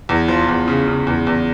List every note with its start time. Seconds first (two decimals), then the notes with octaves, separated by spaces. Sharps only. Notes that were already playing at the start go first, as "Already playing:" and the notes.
0.09 E2
0.28 F3
0.49 E2
0.68 C#3
0.88 C#3
1.07 E2
1.27 E2